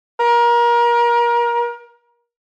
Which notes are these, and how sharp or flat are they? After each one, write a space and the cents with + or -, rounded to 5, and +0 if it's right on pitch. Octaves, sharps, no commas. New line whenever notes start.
A#4 +30